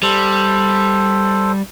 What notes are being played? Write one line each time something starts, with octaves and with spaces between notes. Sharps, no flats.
G3 A4 C5